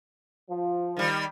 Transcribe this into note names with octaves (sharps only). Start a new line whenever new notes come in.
F3
D#3 G3